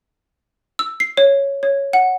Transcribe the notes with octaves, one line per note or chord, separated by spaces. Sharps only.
E6
C7
C#5
C#5
F#5